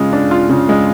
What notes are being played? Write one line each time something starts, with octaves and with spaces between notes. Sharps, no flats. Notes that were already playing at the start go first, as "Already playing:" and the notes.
Already playing: C#3 G#3 F4
D4
F4
C#3
G#3